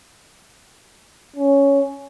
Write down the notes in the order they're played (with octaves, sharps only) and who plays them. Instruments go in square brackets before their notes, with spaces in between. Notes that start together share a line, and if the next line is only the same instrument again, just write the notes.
[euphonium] C#4